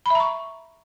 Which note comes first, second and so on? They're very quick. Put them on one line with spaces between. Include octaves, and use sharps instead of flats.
B5 E5 A#5 C#6